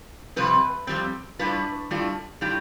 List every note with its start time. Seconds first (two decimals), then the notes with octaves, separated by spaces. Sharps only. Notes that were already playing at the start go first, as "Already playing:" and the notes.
0.36 F2 C3 G3 C4 B4
0.87 F2 C3 G3 C4
1.39 A2 G3 D4 F4 B4
1.91 A2 G3 D4 F4
2.41 A2 G3 D4 F4 G4